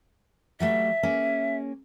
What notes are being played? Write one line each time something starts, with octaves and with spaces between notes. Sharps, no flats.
F#3 G3 A3 E5
A#3 C#4 G#4